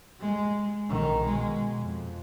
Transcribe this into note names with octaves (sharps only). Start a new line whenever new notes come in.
G#3
B1 D#3
B2 G#3
F2